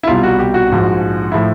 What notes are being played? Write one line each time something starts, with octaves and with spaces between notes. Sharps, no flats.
E4
C2 B2 G3 F4
F#4
G4
F#4
A#1 G#2 F3
A2 F3 E4